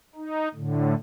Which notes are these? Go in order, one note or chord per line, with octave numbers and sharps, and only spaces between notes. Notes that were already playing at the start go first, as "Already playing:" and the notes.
D#4
A2 D3